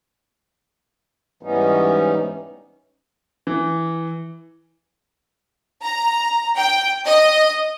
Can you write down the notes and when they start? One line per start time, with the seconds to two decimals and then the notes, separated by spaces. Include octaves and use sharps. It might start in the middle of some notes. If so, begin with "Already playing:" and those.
1.43 G#2 E3 G3 B3 C#4 D#4
3.47 E3
5.82 A#5
6.57 G5
7.07 D#5